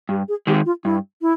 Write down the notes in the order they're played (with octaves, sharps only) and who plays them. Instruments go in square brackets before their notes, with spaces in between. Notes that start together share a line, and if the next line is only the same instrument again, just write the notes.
[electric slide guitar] G2 [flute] G4
[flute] G#4
[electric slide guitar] D#3 G#3 [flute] G4
[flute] F4
[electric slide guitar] G2 [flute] E4
[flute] E4